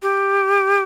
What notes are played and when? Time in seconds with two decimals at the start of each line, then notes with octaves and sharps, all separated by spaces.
0.02 G4